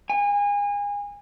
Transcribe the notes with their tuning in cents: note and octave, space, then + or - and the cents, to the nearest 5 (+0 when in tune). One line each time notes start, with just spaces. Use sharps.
G#5 -30